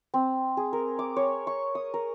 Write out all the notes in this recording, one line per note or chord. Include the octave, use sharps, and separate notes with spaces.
C4
G#4
A#4
D6
C#5
C#6
D#6
A#4